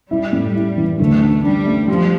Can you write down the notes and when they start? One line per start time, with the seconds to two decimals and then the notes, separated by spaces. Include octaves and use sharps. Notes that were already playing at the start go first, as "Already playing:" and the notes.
0.11 G3 E4
0.32 A2
0.56 E4
0.78 E3
1.00 D2 A3
1.22 D4
1.44 G3 D4
1.66 A3
1.88 F3 G3